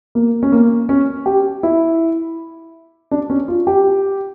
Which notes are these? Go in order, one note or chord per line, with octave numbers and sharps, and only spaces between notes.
A#3
C#4
A#3
C#4
G4
E4
D4
C#4
F4
G4